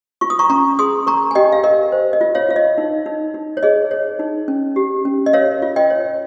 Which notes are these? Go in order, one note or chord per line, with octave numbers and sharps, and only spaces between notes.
F4 C#6
D#6
A#5 C#6
C#4 A#5 C#6
G#4 C6 D#6
A#4 A#5 C#6
G#5
G4 D#5 G5
F5
A#4 D#5
C5
D#5
F4
C#5 F5
F4 F5
D#5
D#4
D#4
D#4
C#5
G#4 D#5
C#5
D#4
C#4
G4
C#4
D#5
A#4 C#5 F5
F4
D#5 G5
C#5